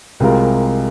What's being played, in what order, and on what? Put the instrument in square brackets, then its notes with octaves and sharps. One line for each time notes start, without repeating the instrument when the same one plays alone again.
[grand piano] C2 C3 G#3 F4 A#4